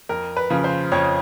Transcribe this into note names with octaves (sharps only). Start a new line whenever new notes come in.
F2 A#4
B4
C#3 F3
C5
F2 C#5